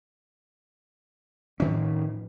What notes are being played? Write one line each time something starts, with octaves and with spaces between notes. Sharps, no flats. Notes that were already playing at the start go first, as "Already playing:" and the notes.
A1 F2 D#3 C#4